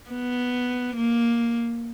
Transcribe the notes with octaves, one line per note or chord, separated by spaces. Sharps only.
B3
A#3